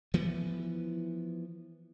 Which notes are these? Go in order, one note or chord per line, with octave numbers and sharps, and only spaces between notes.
E3 F3 B3